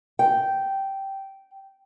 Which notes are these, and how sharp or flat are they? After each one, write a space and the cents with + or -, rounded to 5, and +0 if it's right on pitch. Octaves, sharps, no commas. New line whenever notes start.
G5 -10